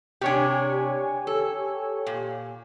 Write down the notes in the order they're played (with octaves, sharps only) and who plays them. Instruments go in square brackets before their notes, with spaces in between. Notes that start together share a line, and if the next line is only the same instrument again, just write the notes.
[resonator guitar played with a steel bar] C3 D4 [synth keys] G4 C#5 G#5
[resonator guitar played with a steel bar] A4
A#2